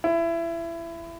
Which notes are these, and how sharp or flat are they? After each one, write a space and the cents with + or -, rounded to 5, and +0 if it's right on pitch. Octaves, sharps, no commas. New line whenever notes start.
E4 +25